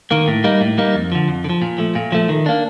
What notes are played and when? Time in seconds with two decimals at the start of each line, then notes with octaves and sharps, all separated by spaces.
0.11 D#3 A#3
0.28 A2
0.44 G3 A#3 D#4
0.61 A2
0.78 G3 A#3 D#4
0.95 F2
1.12 D3 F3
1.28 F2
1.44 D3
1.50 F3
1.62 A#2
1.78 F3 A3
1.95 A#2
2.12 F3 A3
2.29 D#3
2.46 A#3 D4